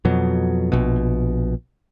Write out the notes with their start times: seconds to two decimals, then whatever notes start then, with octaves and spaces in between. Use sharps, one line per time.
0.05 F2 B2 F#3
0.72 A#1 B2